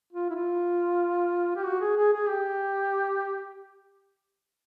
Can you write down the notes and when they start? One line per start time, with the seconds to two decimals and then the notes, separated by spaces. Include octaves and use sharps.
0.13 F4
0.30 E4
0.35 F4
1.56 G4
1.64 F#4
1.81 G#4
1.97 G#4
2.13 G#4
2.29 G4